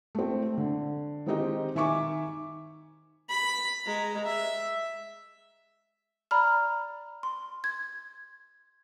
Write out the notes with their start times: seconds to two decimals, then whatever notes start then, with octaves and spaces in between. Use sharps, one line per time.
0.15 A3 C4
0.58 D3
1.26 D#3 G#3 C4 D#4 G4 D#5
1.75 D#3 E5 G#5 C#6 D6
3.29 B5
3.86 G#3 A#5
4.25 E5
6.31 D5 A#5 B5 F6
7.23 C6
7.64 G#6